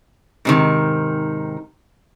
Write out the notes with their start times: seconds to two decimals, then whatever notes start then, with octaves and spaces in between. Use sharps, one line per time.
0.45 G#2 C3 D#3